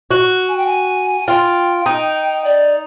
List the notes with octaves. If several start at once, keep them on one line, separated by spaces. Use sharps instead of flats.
F#4
G#5
G5
G#5
F4 G5
D#4
D5